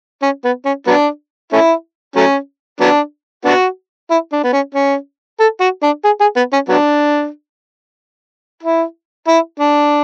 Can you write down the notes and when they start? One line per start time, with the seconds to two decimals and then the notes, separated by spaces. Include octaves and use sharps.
0.22 C#4
0.45 B3
0.65 C#4
0.87 F#3 B3 D4
1.53 A3 C#4 E4
2.16 F#3 A3 C#4
2.81 F#3 B3 D4
3.45 B3 D4 F#4
4.10 E4
4.33 D4
4.44 B3
4.53 C#4
4.75 C#4
5.40 A4
5.61 F#4
5.83 D4
6.05 G#4
6.21 G#4
6.36 B3
6.53 C#4
6.69 F#3 B3 D4
8.63 E4
9.28 E4
9.60 D4